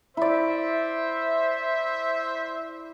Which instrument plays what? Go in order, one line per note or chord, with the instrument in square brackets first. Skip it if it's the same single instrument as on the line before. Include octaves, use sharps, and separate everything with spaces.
[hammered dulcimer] E4 D5 [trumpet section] C5 E5